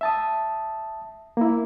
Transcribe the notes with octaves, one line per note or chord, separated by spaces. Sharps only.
E5 A5 D#6
A#3 E4